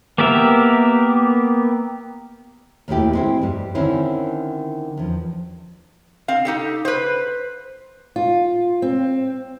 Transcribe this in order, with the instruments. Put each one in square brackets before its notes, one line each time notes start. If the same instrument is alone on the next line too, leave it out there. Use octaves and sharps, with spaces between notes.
[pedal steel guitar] A#3 B3 G4 A#4 E5
[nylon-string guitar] D#2 A#2 G#3 A3 E4 G4
G#3 C4 E4
G2 G3
D3 D#3 C4 C#4 E4
E2 F3
[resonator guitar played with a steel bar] C4 F5
D#4 G4 A4
B4 C5
[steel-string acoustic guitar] F4
C4